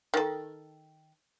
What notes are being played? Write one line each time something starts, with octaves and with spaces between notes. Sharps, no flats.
D#3 A4